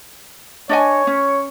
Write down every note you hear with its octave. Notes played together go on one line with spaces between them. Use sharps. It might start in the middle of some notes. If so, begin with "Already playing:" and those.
D4 C#5 D#5 G#5
C#4